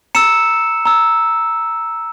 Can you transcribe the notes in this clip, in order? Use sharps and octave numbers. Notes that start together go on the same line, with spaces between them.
A#5 E6 C#7 E7
A#5 E6